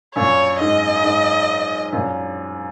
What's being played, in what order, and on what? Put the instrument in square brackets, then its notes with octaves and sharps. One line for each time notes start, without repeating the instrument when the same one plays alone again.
[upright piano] F#2 A#2 [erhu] C#5
[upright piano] G#2 [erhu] D#5
[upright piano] G#2
F#2 A#2